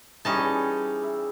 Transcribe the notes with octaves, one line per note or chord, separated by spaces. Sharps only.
E3 G3 C#4 D#4 G#4 A5
E5